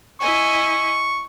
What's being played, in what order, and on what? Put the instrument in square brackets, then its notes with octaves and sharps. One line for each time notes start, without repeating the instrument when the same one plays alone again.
[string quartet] E4 D#5 G#5 [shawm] C#6